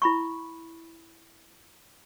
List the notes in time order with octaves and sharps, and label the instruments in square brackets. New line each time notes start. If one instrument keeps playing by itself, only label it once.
[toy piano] E4 B5 C#6